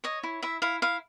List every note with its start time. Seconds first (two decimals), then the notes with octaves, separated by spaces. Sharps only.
0.04 C#5 D#5
0.23 E4
0.43 E4 E5
0.62 E4 F5
0.82 E4 F5